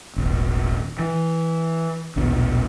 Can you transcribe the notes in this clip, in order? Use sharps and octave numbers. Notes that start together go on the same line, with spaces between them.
D#1 G#1
E3
A#1 D#2 B2